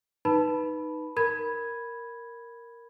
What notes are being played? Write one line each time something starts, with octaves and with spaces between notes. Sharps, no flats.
D#4 B4 A5 B5
A#4 B5 G#6